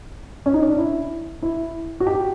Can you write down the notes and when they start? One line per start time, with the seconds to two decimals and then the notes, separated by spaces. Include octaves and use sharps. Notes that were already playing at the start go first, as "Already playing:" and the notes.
0.46 C#4
0.54 D#4
0.62 C#4
0.69 D4
0.78 E4
1.42 E4
2.00 F#4
2.07 G4